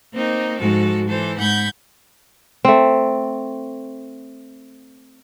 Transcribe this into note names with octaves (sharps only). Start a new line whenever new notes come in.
A#3 C4 D#4
G#2 F3 F#4 A4
E3 A4 C5
G#2 F#5 B5 G6 G#6
A3 C4